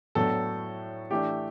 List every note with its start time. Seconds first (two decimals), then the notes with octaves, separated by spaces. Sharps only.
0.15 A2 F#3 B3 D4 A4
1.11 E3 A3 D4 G4